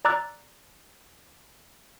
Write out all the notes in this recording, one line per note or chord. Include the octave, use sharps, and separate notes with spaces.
D5 A#5 D6 E6 F#6 A6